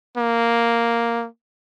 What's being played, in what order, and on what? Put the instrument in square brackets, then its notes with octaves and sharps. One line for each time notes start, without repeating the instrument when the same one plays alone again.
[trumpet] A#3